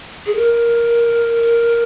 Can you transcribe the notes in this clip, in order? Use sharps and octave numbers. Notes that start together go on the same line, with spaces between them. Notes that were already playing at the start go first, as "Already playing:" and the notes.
G#4
A#4